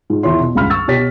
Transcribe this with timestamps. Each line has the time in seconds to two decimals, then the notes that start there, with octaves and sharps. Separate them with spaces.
0.10 G#2
0.23 E2 E4 C#5 C6
0.40 B2
0.55 D#1 C#2 G2 F5 B5 F6
0.70 C#6 E6 A6
0.88 B2 G4 C#5 A6 B6